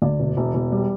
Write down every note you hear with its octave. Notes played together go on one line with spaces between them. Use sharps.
D2 D5
E1
E1
E1
G3